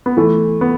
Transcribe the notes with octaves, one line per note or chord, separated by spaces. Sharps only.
B3
E3 A3
B3